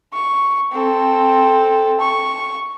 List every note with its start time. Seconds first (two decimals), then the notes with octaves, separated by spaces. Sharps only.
0.13 C#6
0.71 C4 A4
2.00 C#6